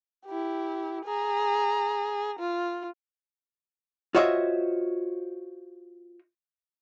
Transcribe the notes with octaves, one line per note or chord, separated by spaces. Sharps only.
E4 G4
G#4 A#5
F4
F4 F#4 C5 C#5 D#5 E5